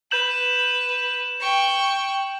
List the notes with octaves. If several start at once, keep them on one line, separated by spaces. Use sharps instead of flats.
B4 G6 E7 F#7
G5 C#6